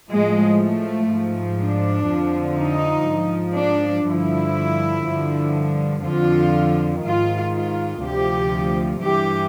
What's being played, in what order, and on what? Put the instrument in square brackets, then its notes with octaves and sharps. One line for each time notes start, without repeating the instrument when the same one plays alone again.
[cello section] A2 F3 G#3
A3
G#2 F3
D4
F2 D3 F3
D#4
G#2 F3
D4
G2 D3 F3 E4
G2 D3 F3
F2 D3 F3 F4
G#2 D#3 F4
F4
D2 C3 F3 G4
G2 E3 G4